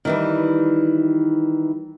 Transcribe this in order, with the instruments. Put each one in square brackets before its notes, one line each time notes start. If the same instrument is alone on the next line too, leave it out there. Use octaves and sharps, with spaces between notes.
[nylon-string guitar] D#3 E3 G3